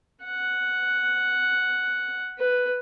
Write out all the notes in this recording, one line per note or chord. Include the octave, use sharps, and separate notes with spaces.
F#5
B4